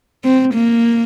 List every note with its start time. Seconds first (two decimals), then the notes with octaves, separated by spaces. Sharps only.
0.24 C4
0.54 A#3